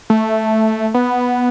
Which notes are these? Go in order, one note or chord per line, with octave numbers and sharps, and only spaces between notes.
A3
B3